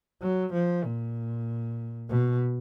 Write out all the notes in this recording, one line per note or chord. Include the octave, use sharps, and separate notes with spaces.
F#3
F3
A#2
B2